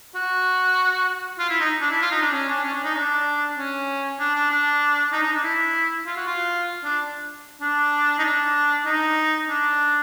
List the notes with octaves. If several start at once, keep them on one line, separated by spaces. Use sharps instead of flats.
F#4
F4
E4
D#4
D4
E4
F4
D#4
D4
C#4
D4
C#4
D4
D#4
D4
C#4
D4
D4
D4
D#4
D#4
D4
E4
F4
F#4
F4
D4
D4
D#4
D4
D#4
D4